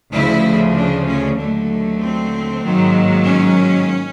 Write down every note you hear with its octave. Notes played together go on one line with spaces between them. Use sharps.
D2 C#3 F3 E4
D4
C#4
D#2 D3 F#3 A3
C4
G#2 D#3 F#3 A#3
C#4